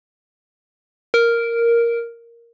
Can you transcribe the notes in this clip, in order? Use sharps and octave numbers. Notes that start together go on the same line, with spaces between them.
A#4